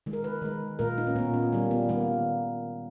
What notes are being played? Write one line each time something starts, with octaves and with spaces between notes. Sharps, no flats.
D#3 G#3
A#4
B4
D#3 G#3
A#2 A#3 A#4
D#4
C#4
A#2 A#3 B3
C#4
D#3 G3 A#3
B3
D#3 G3 A#3